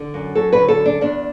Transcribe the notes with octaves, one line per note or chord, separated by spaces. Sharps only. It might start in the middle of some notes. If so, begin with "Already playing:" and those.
Already playing: D3
F#2
F#3 A4
B4
D3
A4
F#2
D4
E2 D4